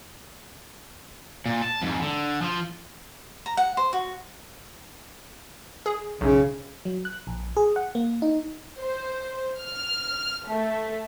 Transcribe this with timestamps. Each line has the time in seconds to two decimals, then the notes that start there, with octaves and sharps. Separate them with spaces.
1.46 A#2
1.62 A5
1.82 F2 G#2
2.02 D3
2.42 F3 F4
3.46 A#5
3.57 F#5
3.77 C5
3.93 F#4
5.86 G#4
6.21 B1 F#2 C#3
6.85 F#3
7.05 F#6
7.27 A#1
7.57 G#4
7.76 F#5
7.95 A#3
8.22 D#4
8.80 C5
9.60 F6
10.48 A3